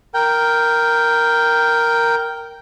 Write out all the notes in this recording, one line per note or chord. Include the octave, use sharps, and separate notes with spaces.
A#4 G5